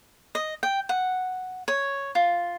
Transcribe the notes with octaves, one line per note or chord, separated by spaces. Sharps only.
D#5
G5
F#5
C#5
F4